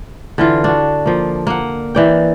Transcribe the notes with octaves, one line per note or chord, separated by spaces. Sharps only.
D3 E3 F4
D4 F#4
F3 A#3
A#3 F#5
E3 D5 G5